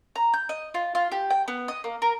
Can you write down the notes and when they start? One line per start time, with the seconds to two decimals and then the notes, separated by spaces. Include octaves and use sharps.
0.16 A#5
0.34 G6
0.49 D#5
0.74 F4
0.95 F4
1.12 G4
1.30 G5
1.48 B3
1.68 D#5
1.84 A#3
2.02 A#4